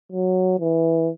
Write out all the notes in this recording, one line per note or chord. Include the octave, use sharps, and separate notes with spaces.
F#3
E3